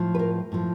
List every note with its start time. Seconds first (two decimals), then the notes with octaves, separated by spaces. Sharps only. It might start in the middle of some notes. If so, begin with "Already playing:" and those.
Already playing: A2 F3
0.15 B4
0.19 A#4
0.52 A2 F3